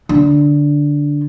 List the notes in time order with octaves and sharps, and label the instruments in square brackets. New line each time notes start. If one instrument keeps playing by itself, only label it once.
[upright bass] D3